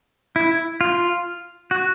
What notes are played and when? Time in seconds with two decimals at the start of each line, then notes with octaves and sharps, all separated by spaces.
0.36 E4
0.81 F4
1.71 F#4